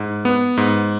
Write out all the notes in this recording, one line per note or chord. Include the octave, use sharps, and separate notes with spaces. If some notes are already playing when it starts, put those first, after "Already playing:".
Already playing: G#2
B3
G#2